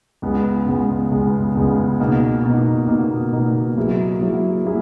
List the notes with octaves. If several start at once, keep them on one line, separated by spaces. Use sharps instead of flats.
C#2 C#3 G#3 B3
C#2 C#3 G#3 B3
C#2 C#3 G#3 B3
C#2 C#3 G#3 B3
B2 A#3 D#4
B2 A#3 D#4
B2 A#3 D#4
B2 A#3 D#4
F#3 A#3 E4 G#4
F#3 A#3 E4 G#4
F#3 A#3 E4 G#4